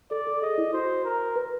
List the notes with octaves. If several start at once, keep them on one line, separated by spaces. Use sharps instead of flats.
A4 D5
A4
G#4 D#5
E4
F#4 C5
A#4
B4